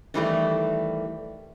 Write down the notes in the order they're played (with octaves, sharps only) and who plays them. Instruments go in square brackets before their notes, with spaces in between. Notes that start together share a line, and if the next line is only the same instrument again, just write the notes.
[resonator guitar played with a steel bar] D#3 E3 G3 A3